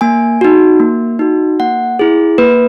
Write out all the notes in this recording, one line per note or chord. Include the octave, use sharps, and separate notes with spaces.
A#3 G#5
D#4 F#4
A#3
D#4 F#4
A#3 F#5
E4 G#4
A#3 B4